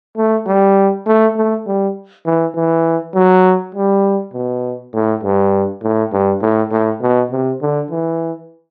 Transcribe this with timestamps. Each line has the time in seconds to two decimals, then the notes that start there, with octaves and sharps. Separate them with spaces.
0.17 A3
0.47 G3
1.06 A3
1.36 A3
1.67 G3
2.26 E3
2.55 E3
3.14 F#3
3.75 G3
4.34 B2
4.94 A2
5.23 G2
5.83 A2
6.12 G2
6.42 A2
6.71 A2
7.01 B2
7.31 C3
7.61 D3
7.91 E3